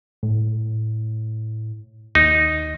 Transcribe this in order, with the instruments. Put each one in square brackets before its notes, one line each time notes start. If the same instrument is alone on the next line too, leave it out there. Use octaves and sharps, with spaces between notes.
[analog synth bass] A2
[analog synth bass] D#2 [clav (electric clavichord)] D#4